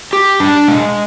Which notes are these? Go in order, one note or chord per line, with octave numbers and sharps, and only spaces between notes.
G4
D4
G#3